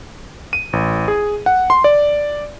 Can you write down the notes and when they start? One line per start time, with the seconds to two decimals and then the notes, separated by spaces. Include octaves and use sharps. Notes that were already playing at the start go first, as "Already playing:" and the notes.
0.53 D#7
0.73 A1
1.08 G#4
1.46 F#5
1.70 C6
1.84 D5